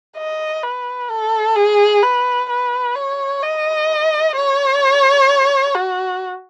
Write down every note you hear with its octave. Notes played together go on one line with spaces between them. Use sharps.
D#5
B4
A4
G#4
B4
B4
C#5
D#5
C#5
F#4